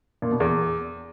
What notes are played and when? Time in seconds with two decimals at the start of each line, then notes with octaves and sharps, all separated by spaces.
0.22 A#2
0.31 B2
0.40 E2